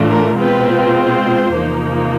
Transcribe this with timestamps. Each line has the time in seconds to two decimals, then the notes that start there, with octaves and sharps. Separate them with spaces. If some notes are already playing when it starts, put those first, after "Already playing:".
Already playing: A2 E3 A3 D4 F4
0.09 A#4
0.37 B2 G#3 C4 F4 B4
0.95 C5
1.52 E2 C3 F3 A#3 D#4